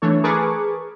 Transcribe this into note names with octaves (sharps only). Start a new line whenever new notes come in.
E3 A3 D4 A4 C#5
G#4 A#4 B4 A5 C#6 D6